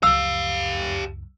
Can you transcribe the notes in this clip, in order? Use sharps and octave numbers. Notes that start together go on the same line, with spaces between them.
C#2 F#2 G4 F5 E6